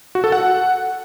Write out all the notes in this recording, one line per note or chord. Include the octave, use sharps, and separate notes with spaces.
F#4
A4
F#5